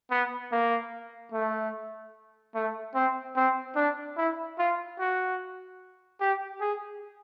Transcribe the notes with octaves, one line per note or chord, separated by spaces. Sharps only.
B3
A#3
A3
A3
C4
C4
D4
E4
F4
F#4
G4
G#4